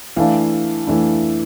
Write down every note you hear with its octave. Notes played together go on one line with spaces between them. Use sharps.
E3 A3 D4 F5
E3 A3 D4